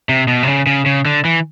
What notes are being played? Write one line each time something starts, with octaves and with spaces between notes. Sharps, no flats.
C3
B2
C3
C#3
C#3
C#3
D3
E3